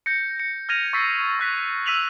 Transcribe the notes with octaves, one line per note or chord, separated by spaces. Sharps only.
G6 A#6 C#7
C#7
F6 G#6 A#6 D#7 F7
C#6 E6 G#6 A6 B6 C7
C#6 F#6 B6
E6 B6 D#7 F7 F#7